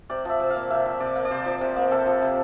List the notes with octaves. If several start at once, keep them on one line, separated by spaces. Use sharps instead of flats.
C3 D5
F3 E5
C3
F5
A#3
C3 E5
F3
C3 D5
A#3
D5
C3 C5
F3
C3
A#3
C3 A4
F3
C3